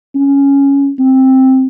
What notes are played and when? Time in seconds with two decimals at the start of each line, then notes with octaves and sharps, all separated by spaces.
0.15 C#4
0.99 C4